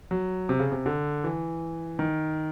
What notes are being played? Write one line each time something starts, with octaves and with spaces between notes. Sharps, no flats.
F#3
C3
C#3
C3
D3
E3
D#3